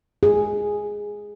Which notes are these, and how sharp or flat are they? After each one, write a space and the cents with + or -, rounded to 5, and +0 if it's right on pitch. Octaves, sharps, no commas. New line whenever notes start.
G#4 -5